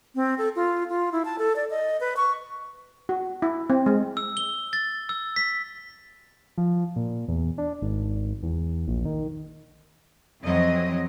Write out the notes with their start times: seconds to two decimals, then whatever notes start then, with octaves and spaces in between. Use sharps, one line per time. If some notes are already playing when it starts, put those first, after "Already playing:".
0.15 C4
0.38 A4
0.56 F4
0.89 F4
1.12 E4
1.25 A5
1.38 A4
1.56 D5
1.70 D#5
2.00 B4
2.16 C#6
3.09 F#4
3.42 E4
3.70 C4
3.86 G#3
4.17 E6
4.37 G7
4.73 A6
5.09 E6
5.36 B6
6.58 F3
6.96 A#2
7.28 E2
7.58 D4
7.82 G#1
8.43 E2
8.88 A#1
9.05 D#3
10.42 F2 E3 F#3 C4 D#5